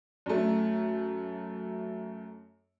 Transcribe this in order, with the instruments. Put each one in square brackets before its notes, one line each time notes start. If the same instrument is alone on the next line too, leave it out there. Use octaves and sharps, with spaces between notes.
[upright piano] F#2 A3